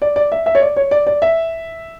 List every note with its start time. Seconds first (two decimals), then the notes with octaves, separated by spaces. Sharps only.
0.02 D5
0.16 D5
0.32 E5
0.46 E5
0.55 C#5
0.61 D5
0.76 C#5
0.91 D5
1.07 D5
1.22 E5